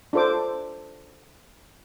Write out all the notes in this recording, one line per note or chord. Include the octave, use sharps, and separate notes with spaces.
D4 F4 A4 C5 D6